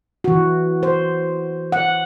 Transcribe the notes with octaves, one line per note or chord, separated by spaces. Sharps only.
E3 F#4
C5
F#5